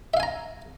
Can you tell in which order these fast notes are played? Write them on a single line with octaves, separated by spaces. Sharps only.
E5 F5 G#5 A#5